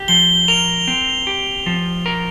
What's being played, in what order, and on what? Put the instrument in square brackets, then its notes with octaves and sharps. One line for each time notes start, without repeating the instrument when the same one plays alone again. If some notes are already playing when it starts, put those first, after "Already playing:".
Already playing: [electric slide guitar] G4
[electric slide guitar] F3 [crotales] G7
[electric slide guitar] A#4 [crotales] F7
[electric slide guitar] C4
G4
F3
A#4